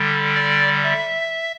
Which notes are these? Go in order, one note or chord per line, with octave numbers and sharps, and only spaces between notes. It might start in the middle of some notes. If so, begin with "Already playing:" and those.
Already playing: D3 G3
D5
E5